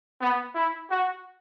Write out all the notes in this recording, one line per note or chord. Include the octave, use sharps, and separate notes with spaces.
B3
E4
F#4